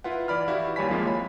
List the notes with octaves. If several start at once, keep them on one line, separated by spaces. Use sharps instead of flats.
E4 F4 B4 F#5
E3 D5 B5 F6
E4 F#4 G4 F5
D#2 G3 C#5 G#5 B5 B6
F3 G#3 A#3 C4 F4
C#5 F5 B5